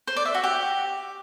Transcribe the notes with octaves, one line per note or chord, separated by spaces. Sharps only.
C5
D5
E5
F#4
G4